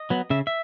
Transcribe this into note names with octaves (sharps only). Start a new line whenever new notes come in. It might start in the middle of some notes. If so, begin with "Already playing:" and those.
Already playing: D#5
F#3 B3
C#3 E5
E5